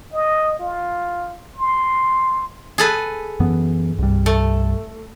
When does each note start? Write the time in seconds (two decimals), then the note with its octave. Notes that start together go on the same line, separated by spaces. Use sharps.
0.13 D#5
0.59 F4
1.57 C6
2.78 G#4 A4 B4
3.40 F#2 E3 B3
3.98 C2 G2
4.26 A3